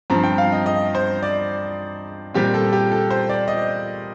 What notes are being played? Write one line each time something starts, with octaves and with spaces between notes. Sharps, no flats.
G2 F3 C4 A#5
G5
F5
D#5
D#5
C5
D5
A#2 G3 C4 G4
A4
G4
A4
C5
D5
D#5